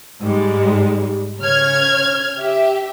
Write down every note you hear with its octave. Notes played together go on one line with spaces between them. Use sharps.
G#2 G3 G#3
C#3 C#5 F6 G#6
G4 E5